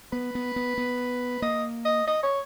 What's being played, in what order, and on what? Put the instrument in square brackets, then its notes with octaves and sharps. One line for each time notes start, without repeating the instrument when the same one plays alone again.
[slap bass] B3 [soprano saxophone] B4
[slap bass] B3
B3
B3
[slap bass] A#3 [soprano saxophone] D#5
[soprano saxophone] D#5
D#5
C#5